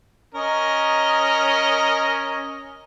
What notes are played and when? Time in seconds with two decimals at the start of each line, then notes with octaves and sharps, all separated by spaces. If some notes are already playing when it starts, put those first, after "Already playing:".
0.35 C#4 A#4 D#5